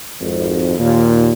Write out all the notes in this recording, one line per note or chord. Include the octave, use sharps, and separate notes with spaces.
G#1 F2
D#2 A#2